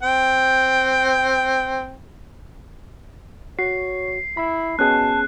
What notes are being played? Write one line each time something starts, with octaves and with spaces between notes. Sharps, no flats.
C4 G5
F#4 C#5 C7
E4 B5
B2 B3 C#4 G#4 A5 F#6